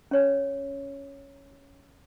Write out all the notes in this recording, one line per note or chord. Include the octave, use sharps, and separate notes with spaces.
C#4 C#5